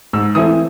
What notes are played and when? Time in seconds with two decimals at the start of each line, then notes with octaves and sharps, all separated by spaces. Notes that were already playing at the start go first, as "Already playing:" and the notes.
0.13 G#2 E6
0.35 E3 A3 C4 E4 D#6